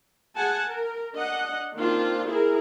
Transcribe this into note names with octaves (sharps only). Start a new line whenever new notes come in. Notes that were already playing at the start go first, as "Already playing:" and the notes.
G#4 F#5 G#5 A5
A#4
D4 D#5 F#5
D#3 A#3 C4 D4 F4
E4 G#4 A#4